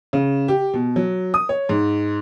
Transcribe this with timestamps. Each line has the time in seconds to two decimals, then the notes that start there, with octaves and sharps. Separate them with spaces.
0.13 C#3
0.48 G4
0.74 B2
0.96 F#3
1.34 D#6
1.49 C#5
1.69 G#2